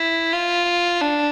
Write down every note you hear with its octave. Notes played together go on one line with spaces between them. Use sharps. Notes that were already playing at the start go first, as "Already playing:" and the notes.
Already playing: E4
F4
D4